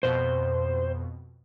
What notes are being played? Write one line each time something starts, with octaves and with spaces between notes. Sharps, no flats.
F2 B2 C5